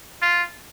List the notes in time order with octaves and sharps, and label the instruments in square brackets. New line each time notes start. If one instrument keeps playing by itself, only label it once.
[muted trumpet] F4